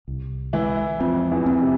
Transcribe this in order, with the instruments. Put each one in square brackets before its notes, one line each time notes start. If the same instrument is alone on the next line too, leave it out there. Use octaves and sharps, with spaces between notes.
[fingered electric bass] C2
[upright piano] E3 E4 [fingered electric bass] G#3
[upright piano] F2 F3 [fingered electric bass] C4
[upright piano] E2 E3
[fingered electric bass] C4
[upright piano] C3